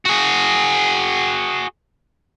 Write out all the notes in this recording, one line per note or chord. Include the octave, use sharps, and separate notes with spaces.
F#4 G#4